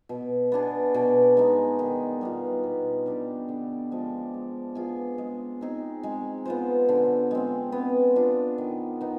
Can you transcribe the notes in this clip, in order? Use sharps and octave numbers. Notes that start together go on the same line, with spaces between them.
B2
B3 D4 G#4
B2
G#3 B3 D#4
D#3
G3 B3 F4
B2
G3 D4 G4
D3
F3 G#3 D4
G#3
B3 F4 G#4
G#3
C4 D#4 G#4
G#3
B3 F4 C5
D3
G#3 C4
B3
D4 F4
D#3
B3 D#4